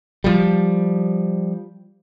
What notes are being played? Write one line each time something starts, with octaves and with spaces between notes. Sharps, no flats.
F3 G3